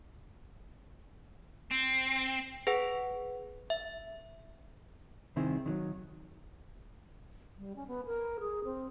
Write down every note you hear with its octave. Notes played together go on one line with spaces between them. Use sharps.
C4
G#4 B4 F#5
E5
C2 D#3 C4 E4 G#4
D#3 E3 F#3
G3
C#4
B3
A#4
G#4
C4